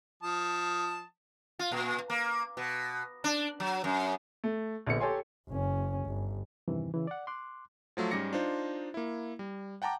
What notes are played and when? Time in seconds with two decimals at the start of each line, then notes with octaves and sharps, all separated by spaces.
0.23 F3 A5 D#6
1.59 F4
1.71 A#2
2.10 A#3
2.57 B2
3.24 D4
3.60 F#3
3.84 F#2
4.44 A3
4.87 A#1 D3 B3 C#7
5.00 G4 A4 C#5 G#5 C6
5.49 F#1 C#4
6.08 G1
6.68 E2 G2 C3 D#3 E3
6.94 C#3 E3
7.07 D5 F#5
7.27 C6 D6 F#6
7.97 F3 F#3 A3 F4
8.11 G#2 G3 C#4 D6 A#6 C#7
8.33 D4 D#4 F4 C5
8.94 A#3 E4
9.39 G3
9.82 F#5 G5 A5 A#5 D6